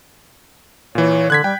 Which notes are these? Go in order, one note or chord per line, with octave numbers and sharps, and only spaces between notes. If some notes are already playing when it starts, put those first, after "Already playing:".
A#2 E3 C#5
D3 F#6 G#6 B6
G3 G5